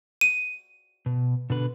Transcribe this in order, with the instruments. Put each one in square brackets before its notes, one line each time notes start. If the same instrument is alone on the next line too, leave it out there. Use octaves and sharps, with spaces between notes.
[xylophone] D#7
[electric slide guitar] B2
B2 D3 B4